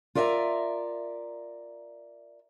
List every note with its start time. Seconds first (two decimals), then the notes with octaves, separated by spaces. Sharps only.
0.15 F4 A#4 D5 E5 F5 A#5